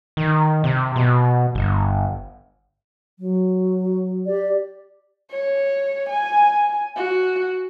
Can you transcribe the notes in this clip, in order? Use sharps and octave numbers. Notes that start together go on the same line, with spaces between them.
D#3
C3
B2
G1
F#3
G4 D5
C#5
G#5
F#4